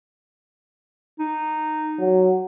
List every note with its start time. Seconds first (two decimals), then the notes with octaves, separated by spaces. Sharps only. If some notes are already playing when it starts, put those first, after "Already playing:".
1.19 D#4
1.99 F#3